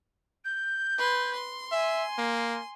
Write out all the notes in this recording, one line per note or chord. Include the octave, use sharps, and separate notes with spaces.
G6
B4 C6
C6
E5 G#5
A#3